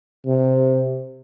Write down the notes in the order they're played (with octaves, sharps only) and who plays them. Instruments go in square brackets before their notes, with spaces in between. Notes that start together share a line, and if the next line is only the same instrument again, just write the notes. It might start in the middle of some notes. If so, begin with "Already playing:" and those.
[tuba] C3